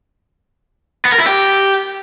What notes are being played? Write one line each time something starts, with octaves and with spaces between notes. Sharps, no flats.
B3
A#4
E4
G4